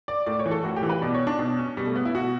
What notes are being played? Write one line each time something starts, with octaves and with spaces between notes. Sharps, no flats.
D5
A2 D5
C#5
E3
A4
A2 F#4
G4
E3
B4
B2 D5
C#5
D4
B2 D4
C#4
B2 G3
A3
B3
E4
B2 F#4